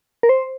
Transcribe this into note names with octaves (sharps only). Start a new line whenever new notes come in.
A#4
C5